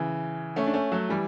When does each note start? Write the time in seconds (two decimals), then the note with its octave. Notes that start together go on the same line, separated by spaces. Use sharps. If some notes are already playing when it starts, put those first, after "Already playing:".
Already playing: C#3 E3
0.56 A3 C#4
0.67 D4
0.74 A3 C#4
0.92 F#3 A3
1.09 E3 G3